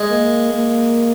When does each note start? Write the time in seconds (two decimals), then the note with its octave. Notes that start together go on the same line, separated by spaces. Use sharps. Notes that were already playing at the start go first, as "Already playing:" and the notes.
Already playing: G#3
0.10 A#3
0.51 A#3